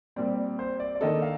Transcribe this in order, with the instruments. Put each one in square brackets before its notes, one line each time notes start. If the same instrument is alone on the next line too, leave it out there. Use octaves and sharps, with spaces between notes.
[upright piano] A#2 G3 C4 [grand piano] D5
[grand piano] C5
D5
D5
[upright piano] D#3 A#3 D4 A4 [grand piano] D#5
[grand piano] F5